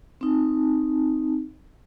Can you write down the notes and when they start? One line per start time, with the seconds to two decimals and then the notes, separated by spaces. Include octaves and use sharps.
0.21 C4 D#4